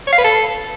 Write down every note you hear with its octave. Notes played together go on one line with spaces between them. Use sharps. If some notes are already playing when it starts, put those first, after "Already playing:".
C#5
F5
B4
A4